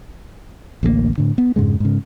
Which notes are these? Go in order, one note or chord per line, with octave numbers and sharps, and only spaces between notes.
A1 D2 G3 A#3
A2 D3
B3
F2 G#2 C#3 G#3
G#2 C#3